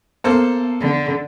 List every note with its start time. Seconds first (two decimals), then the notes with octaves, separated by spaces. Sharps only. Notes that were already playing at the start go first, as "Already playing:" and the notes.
0.24 A#3 B3 A4 C5
0.80 D3